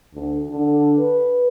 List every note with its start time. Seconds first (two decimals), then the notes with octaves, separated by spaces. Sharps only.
0.14 D2
0.50 D3
0.98 B4